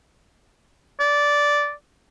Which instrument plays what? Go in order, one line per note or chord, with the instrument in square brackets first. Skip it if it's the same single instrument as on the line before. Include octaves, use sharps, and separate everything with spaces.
[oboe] D5